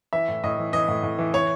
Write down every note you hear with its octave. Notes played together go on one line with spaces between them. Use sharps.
E3 E5
A2
A2 D#5
E3
E3 D#5
A2
A2
E3
E3 C#5